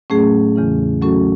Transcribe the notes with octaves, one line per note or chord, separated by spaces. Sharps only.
A2 F#3 A3 C#4 G#4
E2 C#3 E3
F#3 A3 C#4 F#4 A4